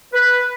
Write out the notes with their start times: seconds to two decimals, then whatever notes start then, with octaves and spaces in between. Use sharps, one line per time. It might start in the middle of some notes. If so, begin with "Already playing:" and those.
0.13 B4